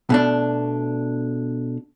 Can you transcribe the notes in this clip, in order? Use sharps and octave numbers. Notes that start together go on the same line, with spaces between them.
B2 A3 D4